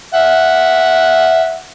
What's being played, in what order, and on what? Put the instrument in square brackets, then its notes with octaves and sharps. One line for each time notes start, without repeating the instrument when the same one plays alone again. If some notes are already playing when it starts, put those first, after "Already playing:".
[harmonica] E5 F#5